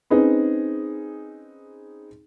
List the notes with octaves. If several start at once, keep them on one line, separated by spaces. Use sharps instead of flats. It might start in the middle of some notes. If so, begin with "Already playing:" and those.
C4 C#4 D#4 G#4 B4